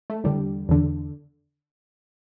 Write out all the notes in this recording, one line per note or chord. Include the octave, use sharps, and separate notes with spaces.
A3
E2 D3 G3
E2 D3